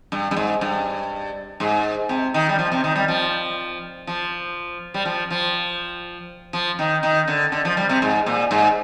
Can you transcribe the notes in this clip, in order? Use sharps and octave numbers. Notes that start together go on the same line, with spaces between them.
G2
G2
G#2
G2
G#2
C3
D#3
G3
F3
C3
D#3
G3
F3
F3
G3
F3
F3
F3
D#3
D#3
D3
D3
F3
G3
C3
G#2
A#2
G#2